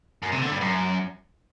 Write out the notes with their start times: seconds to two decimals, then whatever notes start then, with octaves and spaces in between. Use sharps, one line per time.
0.23 F#2
0.32 C3
0.42 D3
0.51 G2
0.61 F#2